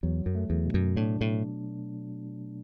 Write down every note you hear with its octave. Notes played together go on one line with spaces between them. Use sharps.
E2 F#3
F#2
A3
E2
B2
F#2
A2 D4
A2